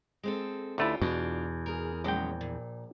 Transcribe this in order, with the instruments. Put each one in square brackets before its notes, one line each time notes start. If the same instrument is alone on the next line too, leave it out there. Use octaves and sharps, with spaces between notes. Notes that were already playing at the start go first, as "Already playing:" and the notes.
[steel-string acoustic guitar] G#3 C4 A4
[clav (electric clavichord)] D2 A3 E4 [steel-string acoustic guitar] C#4 F4 G4
[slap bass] E2 [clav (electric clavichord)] B2 [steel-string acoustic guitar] D4 F4
[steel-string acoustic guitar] G#4 A#4
[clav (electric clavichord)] A#1 G5 [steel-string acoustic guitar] F#3 G#3 C#4
[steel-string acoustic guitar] A#2